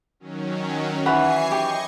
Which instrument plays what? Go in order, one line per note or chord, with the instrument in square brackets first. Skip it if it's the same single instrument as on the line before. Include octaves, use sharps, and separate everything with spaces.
[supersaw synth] D#3 F#3 C#4
[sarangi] E3 [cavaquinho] C#5 F#5 B5 [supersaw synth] G#5 C#6 C7
[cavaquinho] G4 [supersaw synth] D#5 C#6